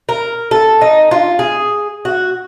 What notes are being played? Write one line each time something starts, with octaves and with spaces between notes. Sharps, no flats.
A#4
A4
D#4
F4
G#4
F#4